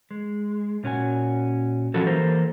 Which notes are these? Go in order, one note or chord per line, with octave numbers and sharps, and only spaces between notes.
G#3
A#2 C#4 F#4 G#5
F3 C#4 F#4 A4
E3 A#3 G4 A4 A#4 C5